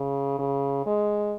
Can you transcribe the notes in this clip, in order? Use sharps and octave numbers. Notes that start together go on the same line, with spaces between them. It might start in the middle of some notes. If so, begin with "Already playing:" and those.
Already playing: C#3
C#3
G#3